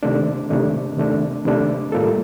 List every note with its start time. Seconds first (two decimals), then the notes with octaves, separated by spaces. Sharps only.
0.03 C3 D#3 A3 D4
0.50 C3 D#3 A3 D4
0.97 C3 D#3 A3 D4
1.45 C3 D#3 A3 D4
1.92 A2 G3 A#3 F4 A4